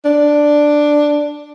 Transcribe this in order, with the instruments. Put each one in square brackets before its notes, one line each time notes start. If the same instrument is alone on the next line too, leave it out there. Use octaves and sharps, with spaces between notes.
[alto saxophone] D4